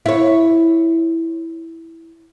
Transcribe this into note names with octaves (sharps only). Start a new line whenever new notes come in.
E4 C#5